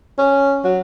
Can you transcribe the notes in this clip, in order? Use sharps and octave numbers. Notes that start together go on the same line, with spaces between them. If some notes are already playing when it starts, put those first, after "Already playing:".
C#4
F#3